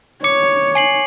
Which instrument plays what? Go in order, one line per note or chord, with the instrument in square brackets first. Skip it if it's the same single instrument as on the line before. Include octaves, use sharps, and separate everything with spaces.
[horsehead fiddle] C#5 [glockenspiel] D6 C#7
[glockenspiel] G#5 C7 F#7